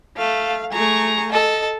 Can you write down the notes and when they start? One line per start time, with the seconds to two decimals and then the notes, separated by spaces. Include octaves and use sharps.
0.17 A3 F5
0.72 A3 G#4 A#5 C#6
1.32 A4 D#5